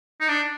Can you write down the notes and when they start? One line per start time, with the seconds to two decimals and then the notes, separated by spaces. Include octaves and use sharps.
0.21 D#4
0.29 D4